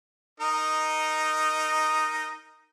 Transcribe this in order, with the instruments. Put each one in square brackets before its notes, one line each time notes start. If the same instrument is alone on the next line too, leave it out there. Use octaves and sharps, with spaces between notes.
[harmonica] D#4 A#4 D#5